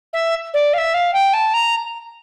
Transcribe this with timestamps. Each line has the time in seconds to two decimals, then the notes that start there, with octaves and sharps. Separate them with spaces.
0.13 E5
0.54 D5
0.74 F5
0.78 E5
0.94 F5
1.13 G5
1.33 A5
1.54 A#5